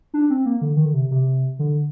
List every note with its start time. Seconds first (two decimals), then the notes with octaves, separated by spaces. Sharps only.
0.14 D4
0.30 C4
0.46 A#3
0.62 D3
0.76 D#3
0.85 D3
0.94 C3
1.11 C3
1.59 D3